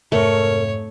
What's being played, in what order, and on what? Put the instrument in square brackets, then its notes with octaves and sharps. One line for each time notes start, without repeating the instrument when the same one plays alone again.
[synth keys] F2 G#2 C3 [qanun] A3 [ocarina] A#4 [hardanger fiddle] C#5